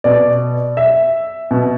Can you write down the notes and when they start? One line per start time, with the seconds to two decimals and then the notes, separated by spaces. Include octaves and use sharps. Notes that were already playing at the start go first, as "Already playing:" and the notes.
0.04 B2 D5
0.77 E5
1.51 B2